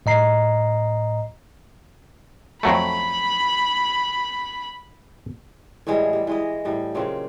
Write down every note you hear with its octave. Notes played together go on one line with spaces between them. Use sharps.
A2 D#5 A#5 C7
F2 F#3 A3 B5
A2 E3 G3 G#3
G3
E3 G#3 D#5
A2 G3
A#2 C#3 F#3 C4